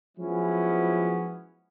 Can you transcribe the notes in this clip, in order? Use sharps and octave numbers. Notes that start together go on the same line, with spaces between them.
F3 F#3 G#3 B3 C#4 E4